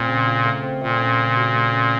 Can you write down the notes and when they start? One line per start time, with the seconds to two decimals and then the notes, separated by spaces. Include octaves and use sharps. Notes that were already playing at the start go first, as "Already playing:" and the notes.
Already playing: A#2 A3 C4
0.08 C#3
0.27 F4
0.45 A3
0.63 C4
0.82 A#2 A3
1.01 C#4
1.19 C#3
1.37 F#4
1.56 A3
1.74 C#4